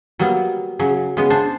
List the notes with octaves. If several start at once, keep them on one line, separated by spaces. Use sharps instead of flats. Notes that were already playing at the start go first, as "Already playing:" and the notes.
F#3 G3 A#3 B3
C#3 F#3
C#3 G#3 B3
D4 C5